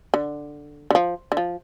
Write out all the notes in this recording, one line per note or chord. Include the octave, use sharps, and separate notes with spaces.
D3
D3
F3
D3
F3